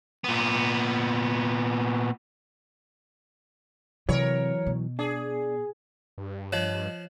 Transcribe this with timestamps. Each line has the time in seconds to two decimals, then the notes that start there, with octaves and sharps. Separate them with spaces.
0.24 A#2 B3
4.09 C3 E3 F#3 A#4 C#5
4.66 B2
4.99 D4 G#4
6.18 G2
6.53 F3 C#5 D#5